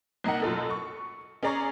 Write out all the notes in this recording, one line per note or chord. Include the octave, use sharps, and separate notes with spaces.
C2 A#3 D#4 D#5 F#5
F#2 B2 F4 A4
C#6
C#4 G#4 D5 A#5 C#6 A#6